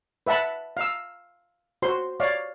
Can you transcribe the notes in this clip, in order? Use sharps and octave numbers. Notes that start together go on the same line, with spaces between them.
B4 E5 F#5 A5 B5
F5 E6
F#4 C5 C6
C#5 D5 F5